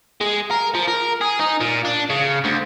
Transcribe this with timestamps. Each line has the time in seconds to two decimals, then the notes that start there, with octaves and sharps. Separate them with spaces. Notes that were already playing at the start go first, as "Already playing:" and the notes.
0.21 G#3
0.51 A#4
0.75 F3
0.88 A#4
1.21 G#4
1.39 D#4
1.61 A#2
1.85 D4
2.10 C#3
2.44 D2